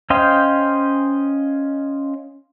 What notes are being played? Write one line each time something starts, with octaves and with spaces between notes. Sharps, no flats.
C#4 C5 D#5 F5 G5